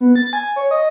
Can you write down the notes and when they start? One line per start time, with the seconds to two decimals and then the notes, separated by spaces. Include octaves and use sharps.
0.01 B3
0.16 A6
0.33 G#5
0.56 C#5
0.71 D#5